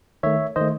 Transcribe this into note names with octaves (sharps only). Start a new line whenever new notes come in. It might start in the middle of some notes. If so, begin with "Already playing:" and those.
D#3 A3 C#5 E5
D#3 A3 C5 D#5